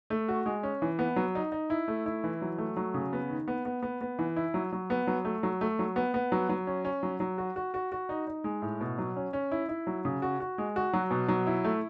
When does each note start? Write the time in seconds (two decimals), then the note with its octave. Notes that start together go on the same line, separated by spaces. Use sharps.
0.10 A3
0.28 F#4
0.46 G#3
0.63 C#4
0.82 E3
0.99 B3
1.16 F#3
1.35 D#4
1.52 D#4
1.70 E4
1.88 A3
2.06 E4
2.24 E3
2.42 F#3
2.58 A3
2.77 F#3
2.94 C#3
3.13 B3
3.30 D#3
3.48 B3
3.65 B3
3.83 B3
4.01 B3
4.19 E3
4.36 E4
4.54 F#3
4.72 F#3
4.90 B3
5.07 F#3
5.25 A3
5.43 F#3
5.61 A3
5.79 F#3
5.96 B3
6.14 B3
6.32 F#3
6.49 F#3
6.67 C#4
6.85 C#4
7.03 F#3
7.20 F#3
7.38 F#4
7.56 F#4
7.74 F#4
7.92 F#4
8.09 D#4
8.27 D#4
8.44 G#3
8.62 A2
8.81 B2
8.98 F#3
9.16 C#4
9.33 C#4
9.52 E4
9.69 E4
9.87 F#3
10.05 C#3
10.22 F#4
10.40 F#4
10.58 G#3
10.76 F#4
10.93 F#3
11.11 B2
11.28 F#3
11.47 E4
11.64 A3